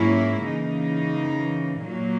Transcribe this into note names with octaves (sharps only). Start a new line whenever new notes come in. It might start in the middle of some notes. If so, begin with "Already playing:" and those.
Already playing: G#2 F#3 A#3 C#4 E4
C#3 E3 A#3 D#4
A#2 F#3 A#3